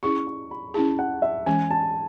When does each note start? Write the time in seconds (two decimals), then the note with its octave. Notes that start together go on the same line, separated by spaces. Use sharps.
0.03 C#4 E4 G#4 C#6
0.27 C#6
0.51 B5
0.74 C#4 E4 G#4 A5
0.99 F#5
1.22 E5
1.46 E3 G#3 C#4 G#5
1.71 A5